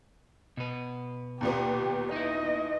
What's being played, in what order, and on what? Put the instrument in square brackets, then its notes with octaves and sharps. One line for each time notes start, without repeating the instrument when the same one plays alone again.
[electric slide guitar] B2 B4
[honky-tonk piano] D#2 A#2 B3 [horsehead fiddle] G4
[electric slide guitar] D#4 E4 [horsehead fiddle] D#5